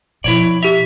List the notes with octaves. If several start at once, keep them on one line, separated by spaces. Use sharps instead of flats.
B2 F3 E4 C#5 D5
G4 E5 F7